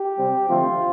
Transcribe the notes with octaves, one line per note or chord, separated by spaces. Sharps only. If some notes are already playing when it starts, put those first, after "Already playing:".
Already playing: G4
C3 G3 C4
D3 F3 A3 C4 F4